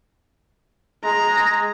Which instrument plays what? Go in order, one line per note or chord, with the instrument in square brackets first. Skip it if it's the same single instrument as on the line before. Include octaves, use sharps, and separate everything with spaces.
[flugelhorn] G#3 [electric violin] A#5